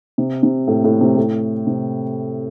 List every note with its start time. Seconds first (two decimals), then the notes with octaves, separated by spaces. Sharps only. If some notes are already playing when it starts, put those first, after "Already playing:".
0.18 C3
0.43 C3
0.68 A2
0.84 A2
1.01 C3
1.17 A2
1.67 C3